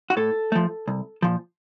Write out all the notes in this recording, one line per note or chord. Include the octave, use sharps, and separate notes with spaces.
F#4
A2 A4
F3 A3
C2
A#2 F3